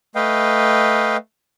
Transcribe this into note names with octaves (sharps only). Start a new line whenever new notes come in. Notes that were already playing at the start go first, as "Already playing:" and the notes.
A3 B4 D#5 F5 G5